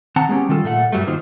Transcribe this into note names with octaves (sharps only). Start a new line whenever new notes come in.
D#3 C4 F#5 A5 A#5
G#3 B3 C#4 G4
D#3 G3 F4 A4
A#2 A3 A4 F#5
G2 F#3 G3 A3
D#3 F#3 A#3 D#4 F4 C5